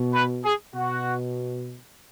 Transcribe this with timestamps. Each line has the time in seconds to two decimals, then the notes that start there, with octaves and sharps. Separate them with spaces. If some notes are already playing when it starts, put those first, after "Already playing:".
Already playing: B2
0.12 B4
0.43 G#4
0.74 B2 F#4